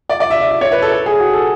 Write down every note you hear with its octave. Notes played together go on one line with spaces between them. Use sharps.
D5
D5
E5
E5
E5
C#5
B4
A4
A4
G#4
F#4
A4